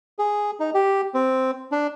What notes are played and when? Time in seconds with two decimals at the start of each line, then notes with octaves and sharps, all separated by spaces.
0.19 G#4
0.60 D#4
0.74 G4
1.14 C4
1.72 D4